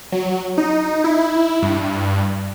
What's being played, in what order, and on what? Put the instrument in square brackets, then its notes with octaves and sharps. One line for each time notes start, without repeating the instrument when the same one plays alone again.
[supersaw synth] F#3
D#4
E4
G2